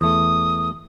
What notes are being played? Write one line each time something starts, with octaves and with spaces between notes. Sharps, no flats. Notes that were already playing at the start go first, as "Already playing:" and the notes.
E2 A3 D#6